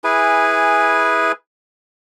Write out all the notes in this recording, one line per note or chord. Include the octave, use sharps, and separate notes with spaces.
E4 G#4 B4 G#5